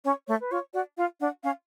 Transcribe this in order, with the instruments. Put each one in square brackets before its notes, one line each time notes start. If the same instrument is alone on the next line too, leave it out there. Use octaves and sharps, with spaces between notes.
[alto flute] C#4 [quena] C#5
[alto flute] A3 [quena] C#5
[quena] B4
[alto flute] F4 [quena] C#5
[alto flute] F#4 [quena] D5
[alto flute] F4 [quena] F5
[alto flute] D4 [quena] F#5
[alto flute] C#4 [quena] F5